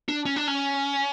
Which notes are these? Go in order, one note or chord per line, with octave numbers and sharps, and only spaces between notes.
D4
C#4
D4
C#4